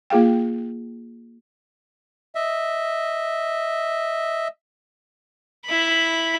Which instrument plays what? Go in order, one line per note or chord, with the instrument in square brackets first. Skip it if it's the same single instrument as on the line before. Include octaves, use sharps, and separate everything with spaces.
[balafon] A#3 F4 G#4 F5 G5
[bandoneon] D#5 E5
[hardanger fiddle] E4 B5